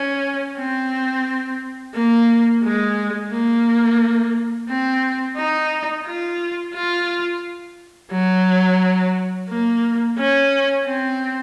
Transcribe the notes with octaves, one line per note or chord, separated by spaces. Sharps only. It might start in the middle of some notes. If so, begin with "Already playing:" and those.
Already playing: C#4
C4
A#3
G#3
A#3
C4
D#4
F4
F4
F#3
A#3
C#4
C4